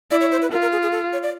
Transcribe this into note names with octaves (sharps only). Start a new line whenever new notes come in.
E4 D5
C#5
C5
B4
F4 A#4
A#4
G#4
G#4
A4
C#5
D5